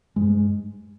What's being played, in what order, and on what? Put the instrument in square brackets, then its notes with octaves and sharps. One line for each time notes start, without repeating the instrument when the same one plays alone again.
[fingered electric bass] G2 G#3